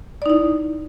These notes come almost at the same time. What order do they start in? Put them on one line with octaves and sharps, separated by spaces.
D5 D#4 E4